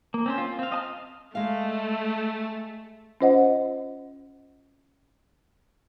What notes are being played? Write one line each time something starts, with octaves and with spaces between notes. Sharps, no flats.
A#3
C4 C#4 C5
F4
C4 F5
D#5 A5 F6
G#3 A3 F5
C#4 F4 C5 D#5 F#5